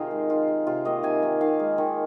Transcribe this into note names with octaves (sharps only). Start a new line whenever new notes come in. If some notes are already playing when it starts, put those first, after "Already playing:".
Already playing: C3 D#3 D#4 F4 G#4 C5 F5
G#3
D#3 F4
G#3
C3 F4
D#3 A#3 D#5
C3 G#5
D#3 A#3
D#3 F5
G#3
D#3